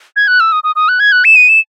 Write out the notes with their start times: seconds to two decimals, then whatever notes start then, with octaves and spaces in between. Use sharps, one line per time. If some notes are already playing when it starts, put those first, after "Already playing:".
0.16 G#6
0.28 F#6
0.40 E6
0.52 D#6
0.64 D#6
0.76 D#6
0.89 F#6
1.00 G#6
1.12 F#6
1.25 E7
1.36 D#7
1.49 E7